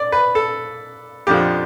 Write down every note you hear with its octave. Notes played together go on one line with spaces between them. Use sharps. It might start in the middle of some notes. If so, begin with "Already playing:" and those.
Already playing: D5
B4
A4
F2 D3 F3 G4